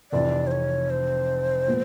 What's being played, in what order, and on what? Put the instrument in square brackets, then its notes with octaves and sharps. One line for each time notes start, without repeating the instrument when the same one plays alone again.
[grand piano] F1 F2 C3 E3 [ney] D5
[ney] C5
C#5
C5
[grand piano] A#2 F3 G#3 B3